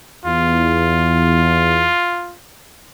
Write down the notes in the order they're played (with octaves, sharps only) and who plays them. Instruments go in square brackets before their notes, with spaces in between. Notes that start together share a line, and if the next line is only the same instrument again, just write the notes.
[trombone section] E2 [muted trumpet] F4